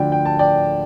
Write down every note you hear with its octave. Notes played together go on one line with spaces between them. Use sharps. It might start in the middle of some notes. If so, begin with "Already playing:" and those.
Already playing: D2 D3 F3 D5 G5
G5
A5
D5 G5